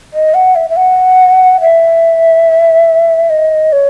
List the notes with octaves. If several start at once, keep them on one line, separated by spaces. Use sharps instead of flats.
D#5
F#5
E5
E5
F#5
E5
D#5
C#5